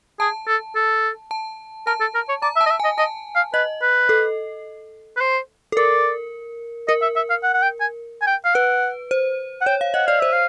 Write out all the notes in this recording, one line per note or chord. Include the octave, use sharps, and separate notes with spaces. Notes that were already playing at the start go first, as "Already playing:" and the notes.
G#4 A5
A4
A4
A5
A#4 A5
A4
A#4
C#5
D5 A#5
E5
A5
D#5
E5
G#5
D#5
D#5 A5
F5
B4 D#5
B4
A4
B4
C5
A4
A#4 D5
A#4 D#5
E5
E5
F5
F#5
F#5
G5
G#5
G#5
G5
F5
B4 F#5
C5
F#5
C#5 G5
F5
D#5 F#5
D5 F5
C5 E5
F5